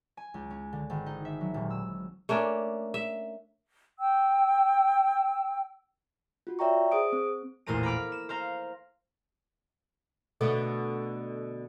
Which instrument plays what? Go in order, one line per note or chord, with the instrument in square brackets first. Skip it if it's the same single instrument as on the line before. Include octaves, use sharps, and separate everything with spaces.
[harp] G#5
C#2
C#4
D3
G#1
D#4
E5
F#3
D#1
E6
[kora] A3 A#3 C#4 D4
E5
[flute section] G5 E6
[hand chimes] F4 F#4
C#5 D5 E5 G5 A#5 C#6
G#4 C5 D#6 D7
C4
[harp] A1 E2 A#2 C5 A#5 D#7
A#5 B5 D6 F6
E7
C5 F5 A#5
[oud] B2 D3 A3 [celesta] A4